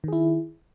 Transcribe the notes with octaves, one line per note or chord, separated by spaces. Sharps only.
D#3 E4 G#4